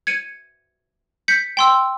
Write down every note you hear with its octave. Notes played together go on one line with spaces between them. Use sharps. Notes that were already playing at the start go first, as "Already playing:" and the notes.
G#6 C#7 D#7
G6 B6 C#7
G5 C6 E6